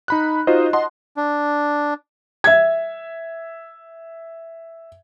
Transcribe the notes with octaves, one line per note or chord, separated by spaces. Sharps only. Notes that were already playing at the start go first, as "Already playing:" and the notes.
D#4 B5 F#6
D#4 F4 F#4 C5 D#5
D#5 F#5 A5 C6
D4
E5 G#6